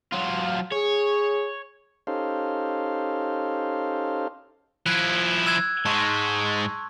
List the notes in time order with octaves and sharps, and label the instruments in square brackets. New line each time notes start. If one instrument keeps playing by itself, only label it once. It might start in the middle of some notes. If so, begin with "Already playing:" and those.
[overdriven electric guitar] F#3 F4
[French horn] G#4 [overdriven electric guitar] C#5
[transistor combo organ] C#4 D#4 G4 A4 C5 F5
[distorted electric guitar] F3 E4 [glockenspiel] F#6 G#6
[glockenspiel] E6 F#6 G#6
[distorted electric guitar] G#2 G#3 [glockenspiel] A5 C6 C#6